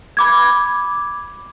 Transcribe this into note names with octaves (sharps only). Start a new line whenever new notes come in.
B5 D6 G#6